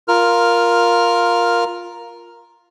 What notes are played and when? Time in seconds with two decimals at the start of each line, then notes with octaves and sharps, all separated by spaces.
0.08 F4 A#4 F6